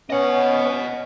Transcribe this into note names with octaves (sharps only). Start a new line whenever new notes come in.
B3 C#4 D#5 F#5